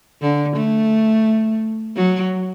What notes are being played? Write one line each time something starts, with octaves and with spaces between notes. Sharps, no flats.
D3
A3
F#3